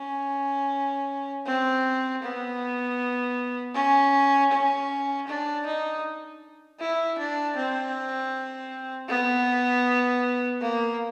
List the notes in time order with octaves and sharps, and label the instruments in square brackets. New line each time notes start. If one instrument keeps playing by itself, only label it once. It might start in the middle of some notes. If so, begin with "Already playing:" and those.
Already playing: [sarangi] C#4
C4
B3
C#4
C#4
D4
D#4
E4
D4
C4
B3
A#3